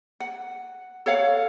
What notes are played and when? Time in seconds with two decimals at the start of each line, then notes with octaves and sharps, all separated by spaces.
0.20 F#5
1.06 A4 C#5 F5 F#5